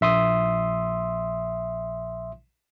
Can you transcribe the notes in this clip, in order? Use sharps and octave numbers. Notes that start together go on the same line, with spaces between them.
A#1 E5 C6 D#6